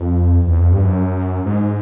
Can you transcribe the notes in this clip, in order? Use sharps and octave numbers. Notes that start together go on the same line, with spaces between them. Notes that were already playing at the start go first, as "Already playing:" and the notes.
Already playing: F2
E2
F2
G2
F#2
G#2